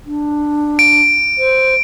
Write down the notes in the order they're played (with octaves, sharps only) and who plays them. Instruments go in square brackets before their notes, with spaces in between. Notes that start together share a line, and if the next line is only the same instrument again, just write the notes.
[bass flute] D4
[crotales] D7
[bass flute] C5